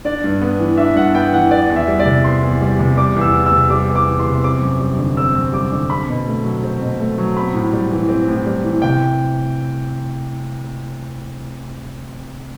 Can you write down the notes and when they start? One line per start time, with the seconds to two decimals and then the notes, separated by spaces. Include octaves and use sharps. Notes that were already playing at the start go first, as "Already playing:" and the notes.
0.05 D4 D5
0.24 G2
0.41 B3
0.59 E3
0.77 D4 E5
0.96 G2 F#5
1.14 B3 G5
1.32 E3 F#5
1.51 B3 D5
1.70 E2
1.76 E5
1.88 G3
1.99 D5
2.05 C3
2.24 B3 C6
2.42 E2
2.61 G3
2.79 C3
2.97 G3 D6
3.16 E2
3.21 E6
3.34 E3
3.46 E6
3.52 C3
3.70 G3 D6
3.89 E2
3.96 D6
4.08 E3
4.20 C6
4.26 C3
4.43 C4 D6
4.62 F#2
4.80 G3
4.98 D3
5.17 C4 E6
5.35 F#2
5.53 G3 D6
5.72 D3
5.90 C4 B5
6.09 B2
6.27 A3
6.44 F#3
6.64 C4
6.81 B2
6.99 A3
7.18 F#3
7.36 C4 B5
7.54 A2
7.73 G3
7.91 E3
8.09 C4
8.28 A2
8.46 G3
8.64 E3
8.82 C3 G5